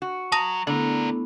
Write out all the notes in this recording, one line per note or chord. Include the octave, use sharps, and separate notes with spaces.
F#4
F#3 A5 D#6 A#6
D3 A3 B3 D4 E4 A#4